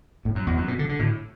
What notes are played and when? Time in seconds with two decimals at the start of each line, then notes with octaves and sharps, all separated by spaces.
0.25 A2
0.35 F#2
0.47 E2
0.57 F#2
0.68 B2
0.79 D3
0.89 D3
0.99 A2